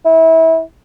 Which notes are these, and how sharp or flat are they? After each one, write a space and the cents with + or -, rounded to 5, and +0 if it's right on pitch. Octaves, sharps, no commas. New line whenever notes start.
E4 -25